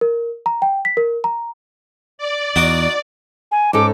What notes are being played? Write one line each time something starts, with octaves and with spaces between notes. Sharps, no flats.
A#4
A#5
G5
B6
A#4
A#5
D5
E2 D#4 F#4 D6
G#5
G#2 C#4 A4 D6